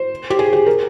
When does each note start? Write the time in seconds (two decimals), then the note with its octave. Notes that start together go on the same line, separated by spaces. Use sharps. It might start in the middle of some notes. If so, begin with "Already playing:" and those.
Already playing: C5
0.30 G4
0.39 G#4
0.53 G4
0.66 A#4